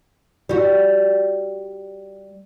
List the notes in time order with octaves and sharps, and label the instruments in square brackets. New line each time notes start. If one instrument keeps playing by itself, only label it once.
[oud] G3 F#4